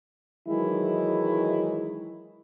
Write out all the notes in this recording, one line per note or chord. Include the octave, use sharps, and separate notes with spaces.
D#3 E3 F#3 G#3 D#4 E4